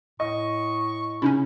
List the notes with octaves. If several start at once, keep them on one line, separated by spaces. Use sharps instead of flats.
A2 D#5 C#6
C#3 C#4 D#4 E4